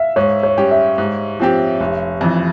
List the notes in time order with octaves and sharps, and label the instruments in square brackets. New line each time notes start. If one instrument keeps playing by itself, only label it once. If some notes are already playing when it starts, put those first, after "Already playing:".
Already playing: [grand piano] E5 F5
[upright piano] G#2 [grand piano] C#5
[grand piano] C#5
[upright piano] G3 C#4 G4
[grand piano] E5
[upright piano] G#2
F3 C4 G4
F1
F2 E3